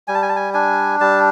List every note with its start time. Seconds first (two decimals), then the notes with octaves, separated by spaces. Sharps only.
0.08 G3 G#5
0.15 A5
0.22 G#5
0.29 A5
0.36 G#5
0.54 D4 G#5
1.00 G3 A5